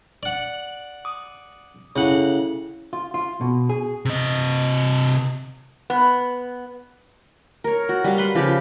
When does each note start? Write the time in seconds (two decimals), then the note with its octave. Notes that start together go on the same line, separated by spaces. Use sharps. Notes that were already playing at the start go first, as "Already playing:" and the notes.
0.23 D5 F#5
1.05 D6 D#6
1.96 C#3 C#4 E4 A4 F#5
2.93 F4
3.14 F4
3.41 B2
3.69 G#4
4.05 C3 D#5
5.90 B3
7.64 A#4 C#5
7.89 F#4
8.04 G3 F5
8.18 B4 F#5 C6
8.35 C#3 F3 G4 F5